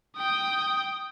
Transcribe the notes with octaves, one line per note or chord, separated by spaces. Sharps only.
G5 D#6